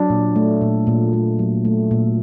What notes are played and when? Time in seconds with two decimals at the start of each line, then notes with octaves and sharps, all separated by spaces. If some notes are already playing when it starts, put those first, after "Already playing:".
Already playing: F#3 D4
0.10 A#2
0.36 A3
0.61 A#2
0.87 A#2
1.13 A3
1.39 F#3
1.65 A3
1.91 A#2